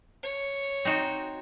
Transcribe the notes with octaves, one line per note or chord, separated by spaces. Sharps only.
C#5
C4 D#4 F#4